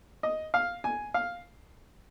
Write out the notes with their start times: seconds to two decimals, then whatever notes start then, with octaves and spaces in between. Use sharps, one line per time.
0.23 D#5
0.54 F5
0.84 G#5
1.14 F5